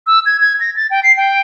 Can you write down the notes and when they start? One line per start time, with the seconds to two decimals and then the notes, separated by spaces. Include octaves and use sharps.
0.07 E6
0.26 G#6
0.40 G#6
0.60 A#6
0.76 A6
0.91 G5
1.03 C7
1.17 G5